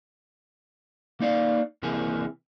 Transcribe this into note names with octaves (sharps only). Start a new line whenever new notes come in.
A#3 D#4 D5 F5
C2 C3 E3 A#3 G#4